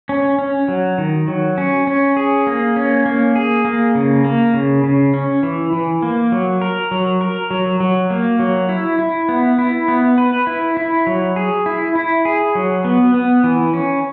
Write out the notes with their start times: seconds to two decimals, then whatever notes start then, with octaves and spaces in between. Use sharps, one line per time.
0.09 C#4
0.39 C#4
0.68 F#3
0.98 D#3
1.28 F#3
1.58 C#4
1.87 C#4
2.17 G#4
2.47 A#3
2.76 C#4
3.06 A#3
3.36 G#4
3.65 A#3
3.95 C#3
4.24 A#3
4.54 C#3
4.84 C#3
5.14 C#4
5.43 E3
5.73 E3
6.02 A#3
6.32 F#3
6.62 A#4
6.91 F#3
7.21 A#4
7.51 F#3
7.80 F#3
8.10 A#3
8.39 F#3
8.69 E4
8.99 E4
9.29 B3
9.58 E4
9.88 B3
10.18 B4
10.47 E4
10.77 E4
11.07 F#3
11.36 G#4
11.66 E4
11.95 E4
12.25 G#4
12.55 F#3
12.85 B3
13.14 B3
13.44 E3
13.74 C#4